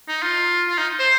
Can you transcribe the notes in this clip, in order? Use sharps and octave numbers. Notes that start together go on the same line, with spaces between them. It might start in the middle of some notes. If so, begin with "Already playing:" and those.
D#4
F4
F4
D#4
C5